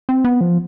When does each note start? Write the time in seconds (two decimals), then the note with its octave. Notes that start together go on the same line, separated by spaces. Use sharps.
0.09 C4
0.25 B3
0.41 F3